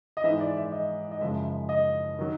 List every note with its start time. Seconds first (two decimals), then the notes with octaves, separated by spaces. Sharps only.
0.17 D#5
0.24 G#2 E3 G#3 E5
0.40 D5
0.57 E5
0.72 D#5
1.12 D#5
1.21 F#2 C#3 F3 G#3 E5
1.69 D#5
2.19 D#3 F#3